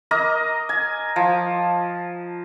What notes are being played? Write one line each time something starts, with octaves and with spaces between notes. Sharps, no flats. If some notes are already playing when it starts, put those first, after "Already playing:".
A#4 D#5 A#5 D6
G#5
F3